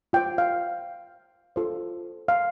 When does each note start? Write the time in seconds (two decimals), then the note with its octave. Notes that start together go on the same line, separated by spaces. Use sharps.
0.13 F4 C5 G5
0.38 F5
1.56 F4 A4 C5
2.28 F5